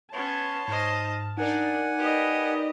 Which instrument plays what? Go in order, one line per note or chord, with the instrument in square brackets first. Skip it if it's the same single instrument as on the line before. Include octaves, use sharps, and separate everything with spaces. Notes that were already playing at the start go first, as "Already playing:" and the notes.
[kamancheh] B3 C#4 [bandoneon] C#5 C6 [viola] A5
[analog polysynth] G#2 F6 [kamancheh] C5 D#5
[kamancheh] D4 [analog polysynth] D#4 A#4 D5 [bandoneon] F#5 G#5
[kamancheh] G4 [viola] B4 D#5